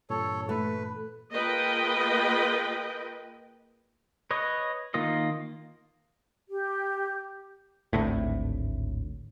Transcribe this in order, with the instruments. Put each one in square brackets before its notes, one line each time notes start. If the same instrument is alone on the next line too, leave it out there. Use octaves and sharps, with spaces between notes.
[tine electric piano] G2 A#2 E3 [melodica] A4 C#5
[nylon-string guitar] A3 [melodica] B4
[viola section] A#3 F4 G#4 B4 D#5 G5
[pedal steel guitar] B4 C#5 D#5
D#3 A#3 F4 D#5
[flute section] G4
[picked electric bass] G#1 D2 A2